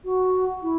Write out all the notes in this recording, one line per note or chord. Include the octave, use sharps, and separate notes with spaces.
F#4
E4